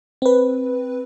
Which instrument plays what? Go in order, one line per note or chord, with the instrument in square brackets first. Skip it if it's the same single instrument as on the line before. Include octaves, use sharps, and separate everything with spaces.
[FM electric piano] C4 B4